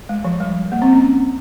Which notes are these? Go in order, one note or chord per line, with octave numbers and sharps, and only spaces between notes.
G#3
F3
G3
A#3
C4
C#4